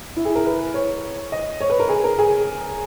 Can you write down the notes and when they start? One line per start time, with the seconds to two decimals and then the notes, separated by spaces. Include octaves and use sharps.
0.16 E4
0.25 G#4
0.35 A#4
0.45 B4
0.74 C#5
1.32 D#5
1.61 C#5
1.70 B4
1.80 A#4
1.89 G#4
2.04 A#4
2.19 G#4